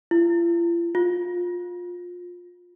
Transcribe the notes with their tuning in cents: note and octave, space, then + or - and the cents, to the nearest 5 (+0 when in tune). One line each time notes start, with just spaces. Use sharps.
F4 -45
F4 +20